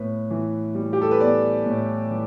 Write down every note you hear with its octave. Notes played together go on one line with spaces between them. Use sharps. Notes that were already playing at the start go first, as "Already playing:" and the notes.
Already playing: A2 B3 B4
E3
G3
G4
A4
B4
B3 D5
A2
E3